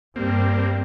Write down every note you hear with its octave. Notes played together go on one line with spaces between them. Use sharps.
G2 G3 A#3 C4